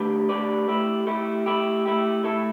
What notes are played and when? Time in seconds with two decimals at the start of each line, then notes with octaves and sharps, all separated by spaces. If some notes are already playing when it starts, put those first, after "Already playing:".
Already playing: D3 A3 G4 B4
0.29 D3 A3 G4 B4 D5
0.68 A3 E4 G4
1.07 A3 E4 G4
1.46 A3 E4 G4
1.86 A3 E4 G4
2.24 A2 A3 E4 A4